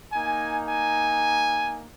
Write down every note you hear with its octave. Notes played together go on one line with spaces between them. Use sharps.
A#3 D#4 G#5
G#5